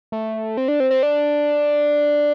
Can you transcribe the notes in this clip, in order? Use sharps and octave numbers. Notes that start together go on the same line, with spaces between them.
A3
C4
D4
C4
C4
D4